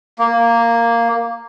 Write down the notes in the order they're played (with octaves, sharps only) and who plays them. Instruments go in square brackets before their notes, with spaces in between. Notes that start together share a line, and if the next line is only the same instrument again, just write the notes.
[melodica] A#3